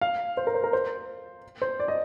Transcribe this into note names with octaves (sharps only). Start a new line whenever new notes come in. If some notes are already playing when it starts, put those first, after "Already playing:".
F5
C5
A#4
C5
A#4
C5
C5
D5
D#5